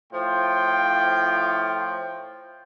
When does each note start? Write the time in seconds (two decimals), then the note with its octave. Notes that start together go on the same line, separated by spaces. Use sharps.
0.13 A2 F3 F4 G5